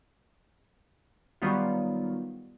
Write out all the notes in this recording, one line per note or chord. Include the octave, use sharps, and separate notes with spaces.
D#3 F#3 G3 B3 D#4 F4